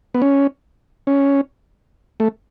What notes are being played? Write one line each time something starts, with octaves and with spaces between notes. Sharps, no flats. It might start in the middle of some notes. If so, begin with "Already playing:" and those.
B3
C#4
C#4
A3